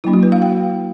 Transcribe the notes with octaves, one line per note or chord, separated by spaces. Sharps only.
F#3 A#3 D4 E4
F#4
B4
F5
G5